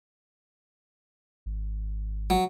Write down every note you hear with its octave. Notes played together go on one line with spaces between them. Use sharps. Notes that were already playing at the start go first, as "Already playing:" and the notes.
G#1
F#3